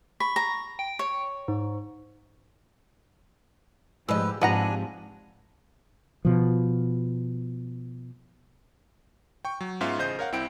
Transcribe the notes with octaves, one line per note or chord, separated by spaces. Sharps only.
B5 C#6
A#5
G5
C#5
G#2
G#2 F3 G4 B4 D#5 E6
G#2 C3 F3 D4 B4 F#5 G#5 A#5
B2 F3
G5 C#6
F#3
G#2 B3 C#4 F4 E5 F5
A1 C#3 C5 D#5 G6
A#4 C#5 F5 F#5
C2 C4 E4 G5 D7